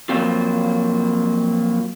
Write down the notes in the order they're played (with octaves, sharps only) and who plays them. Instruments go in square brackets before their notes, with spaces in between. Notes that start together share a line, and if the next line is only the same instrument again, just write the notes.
[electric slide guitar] F3 F#3 G#3 A#3 C4 F4